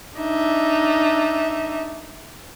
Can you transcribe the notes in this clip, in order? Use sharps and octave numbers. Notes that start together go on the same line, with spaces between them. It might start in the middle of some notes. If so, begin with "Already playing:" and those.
D4 D#4 E5